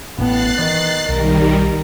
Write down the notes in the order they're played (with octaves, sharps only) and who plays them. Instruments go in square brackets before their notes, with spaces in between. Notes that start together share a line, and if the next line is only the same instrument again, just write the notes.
[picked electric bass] A1 A2 [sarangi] B3 [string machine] F#6 A6 C7
[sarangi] D#3 [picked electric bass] E3
[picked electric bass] B1 [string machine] D#3 G3 [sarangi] A#4